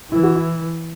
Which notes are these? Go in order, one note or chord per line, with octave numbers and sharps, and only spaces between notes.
E3 E4
F#4
E4